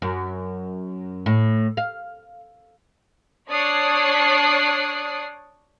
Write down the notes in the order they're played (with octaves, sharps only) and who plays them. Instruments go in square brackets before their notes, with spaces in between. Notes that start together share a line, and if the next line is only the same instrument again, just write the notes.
[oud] F#2
A2
F5
[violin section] D4 C#5 D5 D#6 F#6 C7